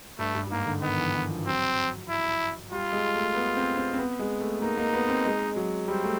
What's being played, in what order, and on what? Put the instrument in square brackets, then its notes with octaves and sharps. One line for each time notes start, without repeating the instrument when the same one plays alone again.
[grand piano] G2 [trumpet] A3
[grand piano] G2
G2
[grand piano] G#2 [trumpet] A#3
[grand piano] D3
[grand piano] D#3 [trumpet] B3
[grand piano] E3
D#3
F3
[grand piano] F#3 [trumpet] C4
[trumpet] E4
[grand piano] G3 [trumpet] F4
[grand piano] G#3
A3
B3
C4
C4
C4
B3
G#3
A3
[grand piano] A#3 [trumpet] D#4
[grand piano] A#3
B3
C4
G#3
F#3
[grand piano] G3 [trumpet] C4
[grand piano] A3